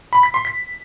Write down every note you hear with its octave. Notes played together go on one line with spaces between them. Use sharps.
B5
B6
C6
B6